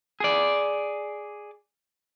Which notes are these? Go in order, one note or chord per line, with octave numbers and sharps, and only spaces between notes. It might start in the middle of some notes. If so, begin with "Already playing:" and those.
G#4 D5